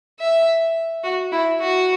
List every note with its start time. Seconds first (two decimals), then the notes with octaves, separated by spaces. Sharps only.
0.20 E5
1.04 F#4
1.32 E4
1.61 F#4